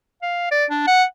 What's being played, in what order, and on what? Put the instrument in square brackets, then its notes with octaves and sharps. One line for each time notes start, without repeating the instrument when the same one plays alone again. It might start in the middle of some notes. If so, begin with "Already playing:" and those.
[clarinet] F5
D5
D4
F#5